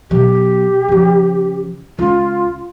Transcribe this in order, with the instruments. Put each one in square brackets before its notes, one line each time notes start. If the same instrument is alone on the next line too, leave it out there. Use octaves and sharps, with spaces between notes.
[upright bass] B2 F#3 [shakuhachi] G4
[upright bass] C#3 F3
[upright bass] C#2 [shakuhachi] F4